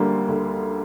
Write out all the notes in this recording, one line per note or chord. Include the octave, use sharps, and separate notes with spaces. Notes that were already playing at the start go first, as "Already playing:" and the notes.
Already playing: D2 D3 G3 A#3
D2